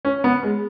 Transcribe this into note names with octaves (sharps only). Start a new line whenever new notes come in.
C#4
B3
G#3